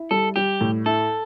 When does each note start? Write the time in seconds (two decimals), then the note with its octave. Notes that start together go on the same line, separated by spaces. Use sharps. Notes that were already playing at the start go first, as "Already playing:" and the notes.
Already playing: E4
0.11 G3 A4
0.36 G3 G4
0.61 A2
0.86 E4 A4